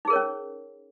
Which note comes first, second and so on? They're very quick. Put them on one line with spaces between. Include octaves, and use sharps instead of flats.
D#4 G#4 A#4 C#5 C#4